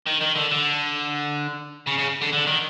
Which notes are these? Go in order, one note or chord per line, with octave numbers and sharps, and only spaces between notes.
D#3
D#3
D3
D3
C#3
C#3
D3
D3
D#3